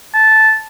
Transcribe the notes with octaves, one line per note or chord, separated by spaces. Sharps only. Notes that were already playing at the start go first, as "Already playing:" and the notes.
A5